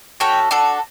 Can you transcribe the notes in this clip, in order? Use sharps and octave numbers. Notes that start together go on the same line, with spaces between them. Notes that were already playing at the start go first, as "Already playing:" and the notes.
C#4 F#4 A4 G5
D4 F#4 A4